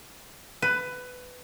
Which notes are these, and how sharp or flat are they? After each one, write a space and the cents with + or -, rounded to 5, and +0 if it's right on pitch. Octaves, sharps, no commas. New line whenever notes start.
B4 +15